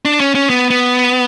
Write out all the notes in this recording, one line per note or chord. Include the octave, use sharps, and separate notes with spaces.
D4
C#4
C#4
B3
B3